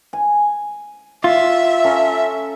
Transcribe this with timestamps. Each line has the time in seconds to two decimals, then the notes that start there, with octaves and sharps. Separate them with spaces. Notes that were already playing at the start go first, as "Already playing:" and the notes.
0.13 G#5
1.24 F4 E5
1.84 C#4 A4 A#5